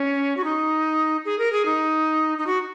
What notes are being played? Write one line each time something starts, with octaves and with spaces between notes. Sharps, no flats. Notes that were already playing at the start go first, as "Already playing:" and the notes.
Already playing: C#4
F#4
D#4
G#4
A#4
G#4
D#4
D#4
F#4